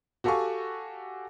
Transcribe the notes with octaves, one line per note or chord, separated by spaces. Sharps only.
F#4 G4 A4 F5 G#5 C#6